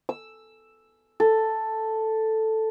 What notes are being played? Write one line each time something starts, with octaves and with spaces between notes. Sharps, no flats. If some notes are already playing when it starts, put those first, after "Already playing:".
E6
A4